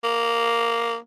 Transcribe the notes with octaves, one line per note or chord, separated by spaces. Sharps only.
A#3